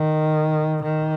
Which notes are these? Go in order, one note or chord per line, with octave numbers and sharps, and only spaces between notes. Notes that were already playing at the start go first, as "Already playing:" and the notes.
Already playing: D#3
D#3